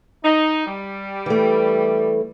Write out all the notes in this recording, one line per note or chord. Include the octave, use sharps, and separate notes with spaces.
D#4
G3
E3 A3